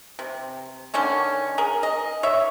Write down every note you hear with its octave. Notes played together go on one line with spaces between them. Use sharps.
C3
D3 D#3 C#4 C#5
G#4 A#4
D#5
C#5 E5